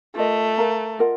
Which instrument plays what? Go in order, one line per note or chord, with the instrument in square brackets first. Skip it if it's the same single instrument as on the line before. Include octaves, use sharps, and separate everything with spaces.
[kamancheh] A3 [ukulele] F4 A#4 D#5
[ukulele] A#4 F5 A#5
F4 A#4 D#5 F#5